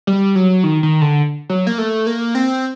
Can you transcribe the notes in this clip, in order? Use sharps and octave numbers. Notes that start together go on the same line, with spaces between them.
G3
F#3
D#3
D#3
D3
F#3
A#3
A3
A#3
C4